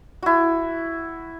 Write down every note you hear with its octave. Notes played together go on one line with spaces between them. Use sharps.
E4 F#4